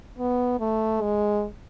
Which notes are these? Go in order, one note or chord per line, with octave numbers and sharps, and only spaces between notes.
B3
A3
G#3